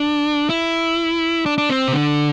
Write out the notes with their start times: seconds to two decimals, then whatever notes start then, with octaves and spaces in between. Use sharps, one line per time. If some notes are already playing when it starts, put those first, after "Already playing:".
Already playing: D4
0.49 E4
1.46 D4
1.58 D4
1.70 C4
1.88 C3
1.93 D3